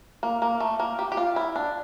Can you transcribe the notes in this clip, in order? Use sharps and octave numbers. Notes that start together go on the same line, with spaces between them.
A#3
A#3
A3
A#3
G4
G4
F4
E4
D4